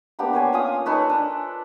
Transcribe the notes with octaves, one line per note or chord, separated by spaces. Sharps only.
A#3 B3 D4 G4
C5 C#5 G#5
C#4 F4 D#6
D#4 A4 B4 C#5
D4